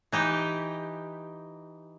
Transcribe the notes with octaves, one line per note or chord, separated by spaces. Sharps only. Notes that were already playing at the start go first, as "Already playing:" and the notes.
E3 D#4 G4